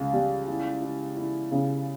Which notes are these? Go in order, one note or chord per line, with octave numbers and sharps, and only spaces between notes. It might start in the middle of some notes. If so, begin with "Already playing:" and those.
Already playing: C#2
G3
E4
E4
E4
C#3